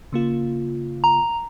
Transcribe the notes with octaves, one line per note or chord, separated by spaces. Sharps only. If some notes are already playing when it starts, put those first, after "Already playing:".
C#3 A#3 F4
A#5